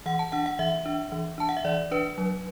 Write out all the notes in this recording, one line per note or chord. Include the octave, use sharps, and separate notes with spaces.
E3 F#5
A5
D4 F#5
F#5
E3 E5
D4
E3
D4 A5
F#5
E5
E3 D5
D4 B4
F#3